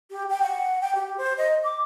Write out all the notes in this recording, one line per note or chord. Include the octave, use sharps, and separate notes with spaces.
G4
G5
F#5
G5
G4
C5
D#5
D6